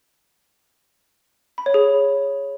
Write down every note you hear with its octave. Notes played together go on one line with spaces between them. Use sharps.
B5
C#5
G#4